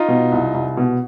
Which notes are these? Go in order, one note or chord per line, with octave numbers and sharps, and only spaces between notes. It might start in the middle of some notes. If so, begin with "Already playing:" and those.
Already playing: D#4 F4
B2
C2
C2
B2